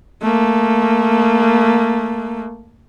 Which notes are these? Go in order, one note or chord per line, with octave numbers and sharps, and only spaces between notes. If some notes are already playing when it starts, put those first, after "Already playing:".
A3 A#3